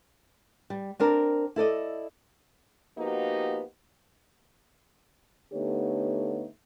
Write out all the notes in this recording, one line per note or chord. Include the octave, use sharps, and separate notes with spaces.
G3
C4 D4 A#4
E4 A4 D5 D#5
F3 A#3 B3 D#4 F#4 G4
D3 A3 B3 D#4 G4 C#5